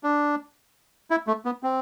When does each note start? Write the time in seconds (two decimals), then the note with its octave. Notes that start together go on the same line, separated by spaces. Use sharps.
0.04 D4
1.11 E4
1.27 A3
1.45 B3
1.63 C4